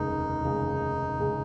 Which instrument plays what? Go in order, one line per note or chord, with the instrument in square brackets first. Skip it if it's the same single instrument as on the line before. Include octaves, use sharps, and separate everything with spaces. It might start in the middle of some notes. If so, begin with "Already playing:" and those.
Already playing: [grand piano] F1 D#2 C#3 G#3 [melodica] D#4
[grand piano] F1 D#2 C#3 G#3
F1 C#3 G#3